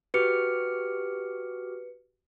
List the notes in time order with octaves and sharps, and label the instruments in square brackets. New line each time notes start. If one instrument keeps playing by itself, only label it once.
[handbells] F#4 G4 F6 [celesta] B4 C#7